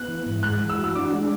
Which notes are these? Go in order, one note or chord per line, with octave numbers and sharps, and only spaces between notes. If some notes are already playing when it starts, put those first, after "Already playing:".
Already playing: B3 F#6
E3
G#2
G#3 F#6
E3
E6
F#4
E6
D4 D6
G#3